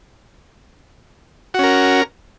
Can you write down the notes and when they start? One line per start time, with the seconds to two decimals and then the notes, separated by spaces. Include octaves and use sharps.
1.54 F#4
1.59 C#4
1.64 A#4